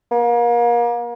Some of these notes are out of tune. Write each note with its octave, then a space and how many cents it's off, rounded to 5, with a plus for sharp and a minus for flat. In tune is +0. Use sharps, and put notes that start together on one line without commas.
A#3 +35